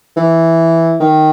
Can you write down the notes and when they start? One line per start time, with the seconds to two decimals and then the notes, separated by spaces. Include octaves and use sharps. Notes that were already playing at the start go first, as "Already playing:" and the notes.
0.16 E3
1.00 D#3